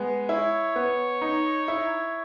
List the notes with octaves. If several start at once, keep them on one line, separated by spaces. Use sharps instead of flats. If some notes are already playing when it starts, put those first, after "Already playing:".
Already playing: G#3 B3
E4 C#5
B3
D#4
E4